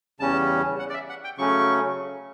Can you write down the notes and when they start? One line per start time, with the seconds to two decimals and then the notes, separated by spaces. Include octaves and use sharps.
0.20 E2 C#3 G3 C#4 A5
0.79 F#5
0.90 D5
0.94 E5
1.09 F#5
1.24 G5
1.38 C#3 F#3 A3 C#4 C#6